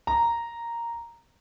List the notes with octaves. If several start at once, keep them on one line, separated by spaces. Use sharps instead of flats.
A#5